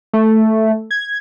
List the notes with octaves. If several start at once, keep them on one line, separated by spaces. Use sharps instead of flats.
A3
G#6